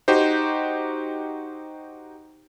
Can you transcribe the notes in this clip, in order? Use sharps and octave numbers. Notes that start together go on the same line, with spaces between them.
D#4 F#4 G4 C5